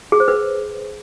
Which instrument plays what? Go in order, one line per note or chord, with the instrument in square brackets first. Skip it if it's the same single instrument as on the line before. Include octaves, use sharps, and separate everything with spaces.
[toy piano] G#4
C5
B4